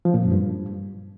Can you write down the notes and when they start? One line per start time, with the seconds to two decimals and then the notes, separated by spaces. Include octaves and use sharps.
0.05 F3
0.14 A#2
0.23 F#2
0.32 G2